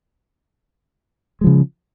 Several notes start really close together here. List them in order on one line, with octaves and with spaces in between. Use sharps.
G#3 F3 C#3